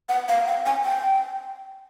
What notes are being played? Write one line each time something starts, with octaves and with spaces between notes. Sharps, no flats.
F#5
F5
G5
G#5
G5